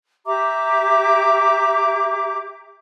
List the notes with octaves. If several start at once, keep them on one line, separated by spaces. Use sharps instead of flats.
G4 E5 A#5 D6